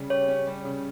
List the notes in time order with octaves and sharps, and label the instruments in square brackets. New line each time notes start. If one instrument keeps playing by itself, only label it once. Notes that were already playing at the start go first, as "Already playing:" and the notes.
Already playing: [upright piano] C#3 G3 C#4 G4
[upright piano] G4 [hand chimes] C#5
[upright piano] C#4
G3
C#3